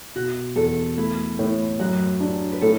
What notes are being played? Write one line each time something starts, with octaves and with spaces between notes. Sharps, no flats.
B2 F#4
E2 A4
A3 E4
A2
F#2 F#4
D4
B4
A2 A4